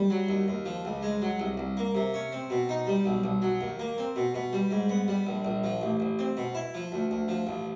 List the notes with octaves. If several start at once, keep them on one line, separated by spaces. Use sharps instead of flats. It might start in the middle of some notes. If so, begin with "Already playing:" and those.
Already playing: G3
F#3
D#2
D#2
F3
C#2
G#3
F#3
C2
C2
A#3
C3
C#4
C4
B2
D#4
G3
B1
B1
F#3
D#2
A#3
C4
B2
B2
G3
G#2
B3
G3
A#1
A#1
F3
A1
A1
C4
B2
E4
F3
D2
D2
F3
A1